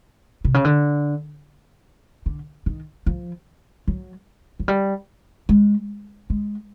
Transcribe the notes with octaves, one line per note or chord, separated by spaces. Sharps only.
C3
C#3
D3
D3
D#3
F3
F#3
F#3
G3
G#3
G#3